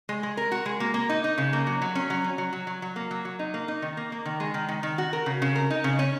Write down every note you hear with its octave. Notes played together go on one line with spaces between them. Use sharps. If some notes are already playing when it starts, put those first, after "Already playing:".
G#3
G#3
A#4
F#4
G#3
A#3
A#3
D#4
D#4
C#3
A#3
F#3
F#3
C#4
F#3
C#4
F#3
F#3
F#3
F#3
A#3
F#3
F#3
D#4
A#3
D#4
D#3
A#3
A#3
D#3
G#3
D#3
D#3
D#3
F#4
A#4
C#3
C#3
A#4
D#4
C#3
C#4